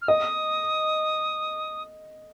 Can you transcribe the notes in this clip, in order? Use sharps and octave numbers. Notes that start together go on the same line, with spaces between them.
F6
D#5 D#6